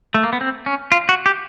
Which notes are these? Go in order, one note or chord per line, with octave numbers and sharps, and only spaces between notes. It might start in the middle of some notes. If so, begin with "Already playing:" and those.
A3
A#3
B3
C4
C#4
F4
F#4
G4